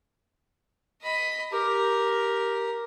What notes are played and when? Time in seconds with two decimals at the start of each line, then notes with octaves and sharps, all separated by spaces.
1.02 D#5 B5
1.52 G4 A#4